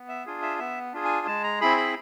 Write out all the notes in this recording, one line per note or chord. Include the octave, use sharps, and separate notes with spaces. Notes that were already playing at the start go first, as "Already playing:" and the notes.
Already playing: B3
E5
D4 F4 G#4
E5
B3 E5
D4 F4 G#4
G#5
G#3 A5
A#5
C4 E4 G#4 B5
B5